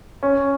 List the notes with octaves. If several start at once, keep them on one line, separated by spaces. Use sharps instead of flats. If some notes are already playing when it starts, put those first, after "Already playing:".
C#4